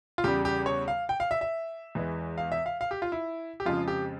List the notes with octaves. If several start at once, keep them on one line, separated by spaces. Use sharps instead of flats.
F4
E2 C#3 G3 G4
G4
C#5
F5
G5
F5
E5
E5
E2 E3 G#3
F5
E5
F5
F5
G4
F4
E4
G4
F2 C#3 F3 G#3 F4
G4